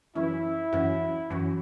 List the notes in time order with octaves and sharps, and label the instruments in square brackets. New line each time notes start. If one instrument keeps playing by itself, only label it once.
[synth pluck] F#2 E3 C#4 [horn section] E4
[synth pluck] F#2 E3 C#4 F#4
F#2 E3 C#4 F#4